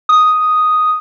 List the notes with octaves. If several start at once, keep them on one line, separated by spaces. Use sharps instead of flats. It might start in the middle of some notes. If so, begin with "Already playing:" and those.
D#6